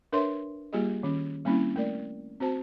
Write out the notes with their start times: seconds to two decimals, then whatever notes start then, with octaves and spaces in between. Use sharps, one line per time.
0.12 D4 A#4 B4 C#5 E5 C6
0.73 G3 A#3 F4 G4 G#4 D#5
1.03 D#3 C#4
1.45 G3 A#3 C4 C#4 E4
1.76 A3 A#4 D5
2.40 C4 F#4 C5 A5